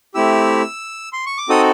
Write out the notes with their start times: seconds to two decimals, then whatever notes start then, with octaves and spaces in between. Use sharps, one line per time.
0.15 A3 C4 E4 G4 E6
1.13 C6
1.26 C#6
1.38 D6
1.49 C4 D#4 F#4 A4 D#6